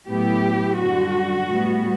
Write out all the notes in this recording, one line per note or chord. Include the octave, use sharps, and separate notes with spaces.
A2 F#3 B3 E4 G4
F#2 D3 G3 F#4
A2 G3 B3